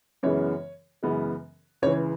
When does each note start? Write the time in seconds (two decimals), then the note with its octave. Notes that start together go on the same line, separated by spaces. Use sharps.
0.23 F#2 C#3 E3 G#3 B3 C#5
1.03 F#2 C#3 E3 G#3 B3
1.82 C#2 C#3 E3 C#5